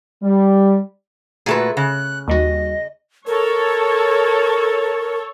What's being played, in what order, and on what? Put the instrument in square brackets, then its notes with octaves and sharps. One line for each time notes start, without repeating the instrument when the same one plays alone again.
[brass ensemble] G3
[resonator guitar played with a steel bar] A#2 A3 B4 [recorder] F#4 [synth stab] G#4
[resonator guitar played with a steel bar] C#3 [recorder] F#6
[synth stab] D#2 G3 F#4 [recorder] D#5
[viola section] A4 C#5 [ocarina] A#4